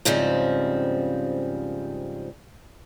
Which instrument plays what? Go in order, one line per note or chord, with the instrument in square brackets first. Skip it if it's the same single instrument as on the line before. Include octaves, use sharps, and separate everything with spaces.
[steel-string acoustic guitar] G#2 C#3 F3 G3 C4